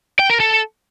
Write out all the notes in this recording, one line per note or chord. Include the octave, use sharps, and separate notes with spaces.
G5
A#4
A4